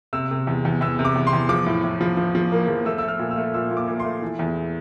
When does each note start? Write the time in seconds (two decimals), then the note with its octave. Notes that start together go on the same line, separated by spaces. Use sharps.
0.13 C3 E6
0.31 C3
0.47 E2
0.65 E2
0.81 E2 E6
0.99 C3
1.05 D6
1.16 E2
1.27 C6
1.33 E2
1.49 F3 D6
1.66 A2
1.84 A2
2.01 F3
2.17 F3
2.35 F3
2.52 A#3
2.68 F3
2.85 A3 E6
2.98 A3 E6
3.08 F6
3.19 A#2
3.31 E6
3.37 A3
3.54 A#2 E6
3.71 A#2
3.77 D6
3.87 A#2
4.00 C6
4.05 A3
4.22 E3
4.39 E2